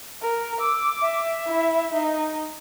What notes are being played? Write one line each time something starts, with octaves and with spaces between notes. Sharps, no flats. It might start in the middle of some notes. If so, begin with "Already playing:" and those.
A#4
D6 E6
E5
E4
D#4 D#5